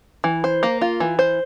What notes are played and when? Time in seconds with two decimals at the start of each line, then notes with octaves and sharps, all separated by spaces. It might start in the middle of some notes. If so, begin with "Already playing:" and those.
0.24 E3
0.44 C5
0.63 A#3
0.81 F4
1.00 E3
1.19 C5